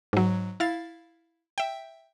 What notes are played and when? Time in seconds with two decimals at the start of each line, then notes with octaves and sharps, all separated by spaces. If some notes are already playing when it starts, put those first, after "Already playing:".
0.13 G#2 F#3
0.60 E4 F5 A6
1.58 E5 G5